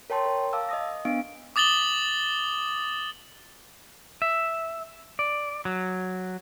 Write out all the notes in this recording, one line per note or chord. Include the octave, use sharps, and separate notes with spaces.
A#4 C#5 G5 A5 C6
A#4
F5 A5 D6 E6
D#5 D#6 A#6
B3 D4 F5 D7
D6 D#6 A6 F#7 G7
E5
D5
F#3